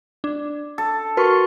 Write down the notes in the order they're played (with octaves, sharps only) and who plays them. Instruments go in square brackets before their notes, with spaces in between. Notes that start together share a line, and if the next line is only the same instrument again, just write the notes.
[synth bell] D4
[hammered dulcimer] A4
[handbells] F#4 A#4 C6 [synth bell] B4 C#6